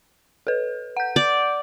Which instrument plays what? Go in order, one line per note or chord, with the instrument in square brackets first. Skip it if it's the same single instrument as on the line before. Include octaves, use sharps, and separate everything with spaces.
[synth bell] A4 B4
F#5 G6
[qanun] D5